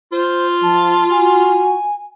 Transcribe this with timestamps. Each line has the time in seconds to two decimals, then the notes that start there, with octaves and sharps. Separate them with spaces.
0.12 F4 C5
0.63 F3 A5
1.11 F#4 G#5